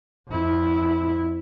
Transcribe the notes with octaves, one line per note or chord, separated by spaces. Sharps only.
F2 E4